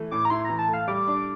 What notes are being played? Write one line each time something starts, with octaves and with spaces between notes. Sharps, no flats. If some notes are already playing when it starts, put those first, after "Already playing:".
Already playing: E3 A3
A2 D6
A#5
E4 C6
E3 A#5
A5
A3 F5
G3 D6
D4